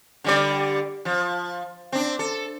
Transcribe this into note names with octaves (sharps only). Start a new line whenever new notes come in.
D3 G3 D5
F3
C4 D4
A4